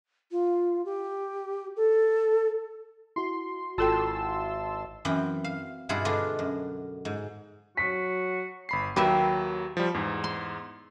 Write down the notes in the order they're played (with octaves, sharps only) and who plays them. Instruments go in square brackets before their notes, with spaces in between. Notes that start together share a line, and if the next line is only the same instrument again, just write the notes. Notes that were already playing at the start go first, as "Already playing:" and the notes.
[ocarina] F4
G4
A4
[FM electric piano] E4 F#4 [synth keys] C6
[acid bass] G#1 [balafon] F4 A4 G5 [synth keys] A5 C6 E6
[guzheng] F#2 E3 B3 C4 G5
F5
G2 B2 E4 F4 G#4 F#5
D3 G#3 B3 D4 F4
F#2
G#2
[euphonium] F#3 [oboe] F#4 [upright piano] B6
[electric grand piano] G1 B5 C7
[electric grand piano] D#2 F#3 A#3 [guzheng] G4 B4 E5
[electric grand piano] F3 G3
E2 G#2
[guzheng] C6